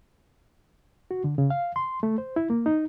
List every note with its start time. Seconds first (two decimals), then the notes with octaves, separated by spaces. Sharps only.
1.11 F#4
1.24 D3
1.38 C#3
1.50 F5
1.76 C6
2.03 A3
2.18 C5
2.36 E4
2.50 A#3
2.66 D#4